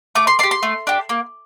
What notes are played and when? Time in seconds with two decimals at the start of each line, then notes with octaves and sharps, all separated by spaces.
0.15 A3 D6
0.27 C6
0.39 D4 C6
0.43 G4
0.51 C6
0.63 A3
0.87 D4 G4
1.09 A#3